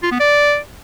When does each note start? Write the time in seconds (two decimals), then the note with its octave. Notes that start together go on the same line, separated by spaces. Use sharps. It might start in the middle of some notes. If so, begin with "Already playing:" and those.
0.03 F4
0.12 B3
0.20 D5